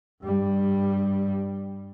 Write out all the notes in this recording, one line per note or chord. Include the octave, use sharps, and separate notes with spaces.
G2 G3